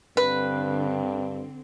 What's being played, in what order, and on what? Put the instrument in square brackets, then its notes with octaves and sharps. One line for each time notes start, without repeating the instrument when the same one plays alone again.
[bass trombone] G2 [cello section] D3 C4 [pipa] B4